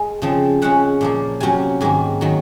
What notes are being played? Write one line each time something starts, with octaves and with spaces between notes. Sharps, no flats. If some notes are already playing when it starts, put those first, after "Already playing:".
Already playing: G#3
C#3 F3 C4
C#3 G#3 C#4 F#5
A#2 F3 A#3
C3 F#3 C#4 G#5
G#2 D#3 A#3 G#5
D#3 F#3